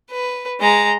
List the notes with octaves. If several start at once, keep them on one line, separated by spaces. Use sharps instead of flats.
B4
G#3 A#5